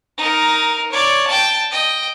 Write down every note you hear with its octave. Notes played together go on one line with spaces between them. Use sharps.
D#4 A#4
C#5 D5
G5 A5
D#5 G5